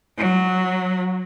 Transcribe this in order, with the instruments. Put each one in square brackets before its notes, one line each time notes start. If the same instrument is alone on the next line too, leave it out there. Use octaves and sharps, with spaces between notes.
[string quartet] F#3